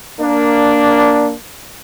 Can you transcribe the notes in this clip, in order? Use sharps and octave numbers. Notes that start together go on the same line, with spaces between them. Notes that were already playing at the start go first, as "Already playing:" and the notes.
A#3 D4